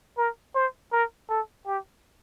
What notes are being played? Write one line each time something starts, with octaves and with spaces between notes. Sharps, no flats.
A#4
C5
A#4
A4
G4